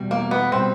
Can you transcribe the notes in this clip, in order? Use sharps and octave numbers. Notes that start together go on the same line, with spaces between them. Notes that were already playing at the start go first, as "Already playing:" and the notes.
Already playing: E2 B2 G3
A#3
B3
B2 G3 C4